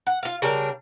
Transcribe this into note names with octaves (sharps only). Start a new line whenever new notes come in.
F#5
F4 F5
C#3 G3 D4 A#4